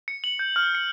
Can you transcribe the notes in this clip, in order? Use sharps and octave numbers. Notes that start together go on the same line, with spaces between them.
C#7
F#7
G6
F6
C#7